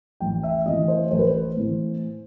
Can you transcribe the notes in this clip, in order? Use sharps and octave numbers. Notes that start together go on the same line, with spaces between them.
A1 G5
E5
A2 E3 D#5
C5
A1 C5
B4
C5
A2 E3